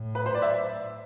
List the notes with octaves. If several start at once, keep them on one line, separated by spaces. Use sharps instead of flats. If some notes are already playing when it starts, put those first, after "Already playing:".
Already playing: A2
B4
C5
D5
E5